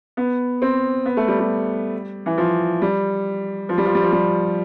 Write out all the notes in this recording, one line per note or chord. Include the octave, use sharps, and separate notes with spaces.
B3
C4
B3
A3
G3
G3
E3
F3
G3
F3
G3
F3
G3
F3
G3